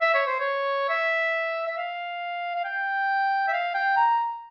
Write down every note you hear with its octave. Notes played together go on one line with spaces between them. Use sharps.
E5
C#5
C5
C#5
E5
E5
F5
F5
G5
E5
F5
G5
A#5